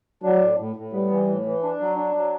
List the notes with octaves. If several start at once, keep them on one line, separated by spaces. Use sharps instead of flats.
F#3 D4
A2
A2
A2
G3 B3
E3
A2
E3
D4
F#3
D4
F#3